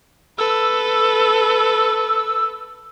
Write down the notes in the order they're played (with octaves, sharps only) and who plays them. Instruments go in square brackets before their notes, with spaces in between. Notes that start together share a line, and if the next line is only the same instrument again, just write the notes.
[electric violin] A4 B4 [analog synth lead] E6